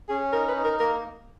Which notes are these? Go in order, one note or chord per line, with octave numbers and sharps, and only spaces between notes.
C#4 G#4
D#4 A#4
B4
D#4
A#4
A#3 A#4